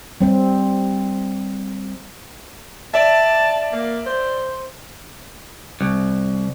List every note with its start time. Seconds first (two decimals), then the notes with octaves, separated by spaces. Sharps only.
0.21 G3 C4
2.94 D5 E5 A5
3.72 A#3
4.06 C5
5.81 C2